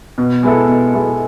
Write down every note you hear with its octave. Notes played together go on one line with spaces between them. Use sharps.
B2
G#3 B3 E4 A4
B2
G#3 B3 E4 A4